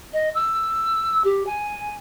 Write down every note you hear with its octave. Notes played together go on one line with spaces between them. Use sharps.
D#5
E6
G4
G#5